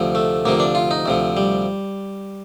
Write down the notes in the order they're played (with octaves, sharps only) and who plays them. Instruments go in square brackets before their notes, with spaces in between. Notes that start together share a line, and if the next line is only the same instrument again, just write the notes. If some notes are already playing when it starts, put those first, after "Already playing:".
Already playing: [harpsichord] D2 C3 F3
A3
D2 C3 F3 A#3
D4
F4
D#4
D2 C3 F3
G3